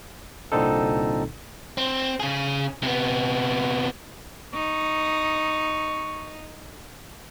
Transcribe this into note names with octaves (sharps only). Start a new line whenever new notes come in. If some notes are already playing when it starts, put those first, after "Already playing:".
C2 A#2 D3 C4 D#4 A4
C4
C#3 G#4
C3 B3
D#4 C#6